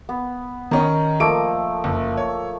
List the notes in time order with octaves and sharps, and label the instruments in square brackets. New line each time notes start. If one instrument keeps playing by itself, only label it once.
[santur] B3
[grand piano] D#3 C#4 [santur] D#5 A#5
[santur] F3 A3 A#3 [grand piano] D7
[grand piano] F#1
C#5